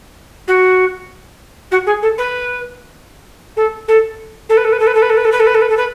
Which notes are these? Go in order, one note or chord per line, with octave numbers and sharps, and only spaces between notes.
F#4
F#4
G#4
A4
B4
A4
A4
A4
B4
A4
B4
A4
B4
A4
B4
A4
B4
A4
B4
A4
B4
A4
B4
A4
B4